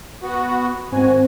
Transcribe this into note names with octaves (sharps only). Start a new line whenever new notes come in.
B3 F#4
G#2 D#3 C4 F#4 C5 G#5